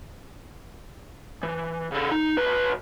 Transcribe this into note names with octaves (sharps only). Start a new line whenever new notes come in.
E3
C#3 A4
D#4
B1 B4